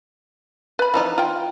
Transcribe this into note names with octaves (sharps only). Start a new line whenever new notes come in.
B4 B5
E3 F3 D#4
F4 G5